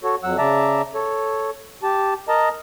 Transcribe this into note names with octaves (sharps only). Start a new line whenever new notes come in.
F#4 A4 C#5
F2 F#3 F#5 E6
C#3 D5 E5 A5 A#5
A4 C#5
G4 A5
A#4 D#5 A5 A#5